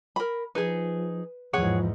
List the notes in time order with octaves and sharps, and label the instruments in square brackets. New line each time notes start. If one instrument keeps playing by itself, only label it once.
[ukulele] A#4 B5
[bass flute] F3 [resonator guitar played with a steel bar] D#4 G#4 [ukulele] B4
[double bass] E2 G#2 [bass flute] F3 [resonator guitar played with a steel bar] G#4 C#5 F#5